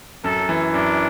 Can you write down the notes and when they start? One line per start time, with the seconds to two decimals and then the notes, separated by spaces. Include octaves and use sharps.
0.24 F#2 A4
0.49 E3
0.74 F#2 D4